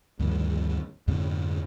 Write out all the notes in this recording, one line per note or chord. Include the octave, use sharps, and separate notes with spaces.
D2 G2 D#3 F3
F2 G#2 D3